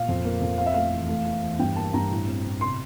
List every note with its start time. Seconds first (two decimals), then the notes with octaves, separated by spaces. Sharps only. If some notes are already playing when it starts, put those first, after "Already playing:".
Already playing: A#2 F5
0.09 F2
0.25 A#3
0.42 F2
0.58 C4 F5
0.66 E5
0.74 A3 F5
0.93 E2
1.09 A3
1.26 E3
1.43 E2
1.59 G2 G5
1.76 A#3 A5
1.94 G2 A#5
2.11 A2
2.27 C4
2.45 A2
2.61 C3 C6